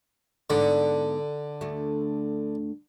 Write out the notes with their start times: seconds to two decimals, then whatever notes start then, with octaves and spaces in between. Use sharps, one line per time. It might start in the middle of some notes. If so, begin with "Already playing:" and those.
0.50 G#2 D3 B3 D5
1.61 D2 A3